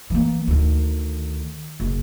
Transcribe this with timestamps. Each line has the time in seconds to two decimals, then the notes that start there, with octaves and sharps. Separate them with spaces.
0.10 E3 A#3
0.47 D2 D#3
1.80 F#1